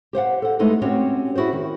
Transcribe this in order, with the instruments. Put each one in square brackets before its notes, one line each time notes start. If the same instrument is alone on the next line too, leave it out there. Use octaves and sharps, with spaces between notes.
[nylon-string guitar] G4 C5 F5 F#5
A4 F#5
G#3 A3 B3 D#4 E4 A4
C4 C#4 F#4 G4 C#5
E4 F#4 G#4 C5
D#3